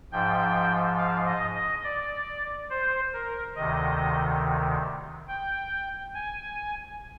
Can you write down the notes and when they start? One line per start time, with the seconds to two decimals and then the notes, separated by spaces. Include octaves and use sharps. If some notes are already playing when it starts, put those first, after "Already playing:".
0.12 G#2 F3 G5
0.98 F5
1.27 D#5
1.55 D#5
1.84 D5
2.70 C5
3.13 A#4
3.56 D2 C3 D#3 D#5
5.28 G5
6.14 G#5